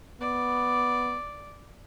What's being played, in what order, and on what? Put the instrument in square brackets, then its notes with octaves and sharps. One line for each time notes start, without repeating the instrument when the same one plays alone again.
[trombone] B3 [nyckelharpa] D5